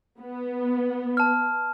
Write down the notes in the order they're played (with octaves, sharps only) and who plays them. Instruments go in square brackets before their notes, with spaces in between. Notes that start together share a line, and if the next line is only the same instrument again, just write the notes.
[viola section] B3
[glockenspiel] A5 F6